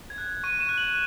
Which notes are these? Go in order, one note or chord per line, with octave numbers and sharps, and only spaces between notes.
G#6
F#6
C#6 D#7
E7
F#6
F#7